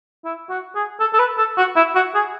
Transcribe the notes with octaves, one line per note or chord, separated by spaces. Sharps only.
E4
F#4
G#4
A4
A4
B4
A4
F#4
E4
F#4
G#4